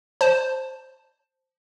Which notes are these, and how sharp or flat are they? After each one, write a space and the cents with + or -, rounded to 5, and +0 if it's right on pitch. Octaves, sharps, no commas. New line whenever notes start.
C5 +0 A5 +0